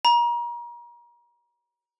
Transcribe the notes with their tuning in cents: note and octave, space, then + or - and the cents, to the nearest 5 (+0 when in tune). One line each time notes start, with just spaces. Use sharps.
A#5 +35